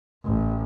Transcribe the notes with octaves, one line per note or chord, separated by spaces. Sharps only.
A1